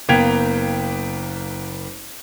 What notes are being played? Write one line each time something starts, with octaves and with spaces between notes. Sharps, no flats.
F#1 A#3 B3 G5 G#6 F7